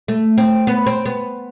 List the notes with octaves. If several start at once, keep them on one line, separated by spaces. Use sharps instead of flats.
A3
C4
B3
C4
B3